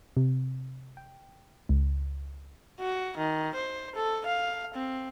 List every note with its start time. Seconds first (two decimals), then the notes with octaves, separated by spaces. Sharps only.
0.17 C3
0.97 G5
1.69 C#2
2.80 F#4
3.18 D#3
3.55 C5
3.95 A4
4.26 F5
4.75 C4